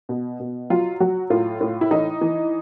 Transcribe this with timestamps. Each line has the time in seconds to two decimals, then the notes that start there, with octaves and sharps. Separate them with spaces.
0.09 B2
0.40 B2
0.70 F#3 F4
1.00 F#3 F#4
1.30 A2 F4
1.61 A2
1.81 E4
1.91 E3 D#4
2.21 E3